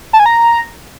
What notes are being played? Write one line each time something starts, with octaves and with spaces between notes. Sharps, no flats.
A5
G#5
A#5